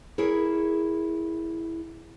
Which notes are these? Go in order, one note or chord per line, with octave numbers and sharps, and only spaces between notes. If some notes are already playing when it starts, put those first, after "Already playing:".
E4 G#4 A#4 C#5